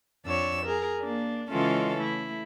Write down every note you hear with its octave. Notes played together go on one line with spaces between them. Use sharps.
F2 D4 C#5 E6
G#4 A#4
A#3 D4
C#3 E3 G#3 C#4 F4 A4
A3 E4